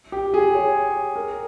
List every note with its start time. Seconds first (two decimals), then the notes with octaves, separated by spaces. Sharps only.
0.12 G4
0.34 G#4
0.55 C#5
1.16 A#4